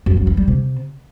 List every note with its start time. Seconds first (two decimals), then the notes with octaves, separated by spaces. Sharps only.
0.06 F#2
0.17 F#2
0.27 E3
0.37 G3
0.47 C3